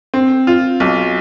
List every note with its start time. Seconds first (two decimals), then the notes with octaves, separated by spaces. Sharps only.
0.14 C4
0.47 F4
0.80 B1